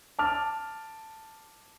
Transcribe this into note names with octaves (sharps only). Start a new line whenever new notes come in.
A5 D6 F6